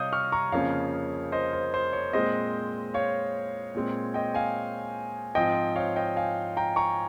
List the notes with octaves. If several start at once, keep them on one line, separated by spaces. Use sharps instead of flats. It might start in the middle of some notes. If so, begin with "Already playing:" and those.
Already playing: C3 G3 C#5 D#5 F5 D#6 G6
C#6 F6
A#5 C#6
F2 C#3 F3 A#3 C#4 C#5 F5
C5 D#5
C5
C5
C#5
A#2 G#3 C4 C5 D#5
C#5 F5
A#2 G#3 C4
D#5 G5
F5 G#5
G#2 F3 C4 D#5 G5
C#5 F5
D#5 G5
F5 G#5
G5 A#5
A#5 C#6